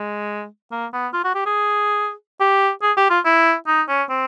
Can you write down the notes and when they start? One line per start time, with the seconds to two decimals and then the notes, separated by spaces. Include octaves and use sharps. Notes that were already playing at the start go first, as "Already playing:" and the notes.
Already playing: G#3
0.71 A#3
0.93 B3
1.13 F4
1.24 F#4
1.35 G4
1.46 G#4
2.40 G4
2.82 G#4
2.97 G4
3.10 F4
3.25 E4
3.67 D#4
3.88 C#4
4.09 C4